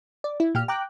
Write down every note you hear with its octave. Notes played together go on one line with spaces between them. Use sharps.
D5
E4
A#2 G4 F6
G5 A#5 D6 F#6